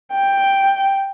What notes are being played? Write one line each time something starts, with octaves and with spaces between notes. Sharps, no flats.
G5